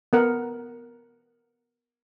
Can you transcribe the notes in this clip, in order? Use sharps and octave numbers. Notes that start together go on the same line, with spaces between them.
B3 A#4 F#5